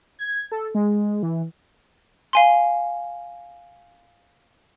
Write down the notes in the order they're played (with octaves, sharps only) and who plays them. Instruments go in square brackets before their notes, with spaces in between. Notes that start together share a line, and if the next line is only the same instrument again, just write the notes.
[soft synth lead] G#6
A4
G#3
E3
[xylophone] F5 G#5 C6